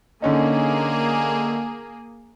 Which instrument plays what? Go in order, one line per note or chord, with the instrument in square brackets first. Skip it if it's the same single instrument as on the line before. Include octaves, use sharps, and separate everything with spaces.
[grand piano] D3 C#4 D#4 [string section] A#3 G#4